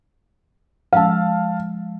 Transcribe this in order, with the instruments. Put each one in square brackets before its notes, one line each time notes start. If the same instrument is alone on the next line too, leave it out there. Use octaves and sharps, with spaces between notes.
[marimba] F3 G#3 E6 [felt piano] F5 A5